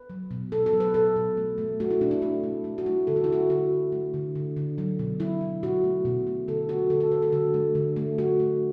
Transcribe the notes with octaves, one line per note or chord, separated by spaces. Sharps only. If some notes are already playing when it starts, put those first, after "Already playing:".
Already playing: B4
F#3
B2
B2 A4
A4
F#3
B4
B2 A4
B2
A3
A3
A3 F#4
E4
B2 D4
E4
A3 D4
A3
A3
F#4
A3 E4
D3 A4
F#4
E4
D3 F#4
D3 F#4
D3
A3
D3
D3
D3
F#3
B2
F#3 E4
F#3
B2 F#4
A3
B2
A3
D3 A4
A3 F#4
D3 A4
A4
D3 B4
A4
D3 F#4
A3
D3
A3
A3 F#4
A3